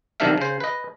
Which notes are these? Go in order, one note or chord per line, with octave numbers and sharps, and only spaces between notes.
B1 C3 D#3 D4 E5 F5
C#3 C5
B4 D#5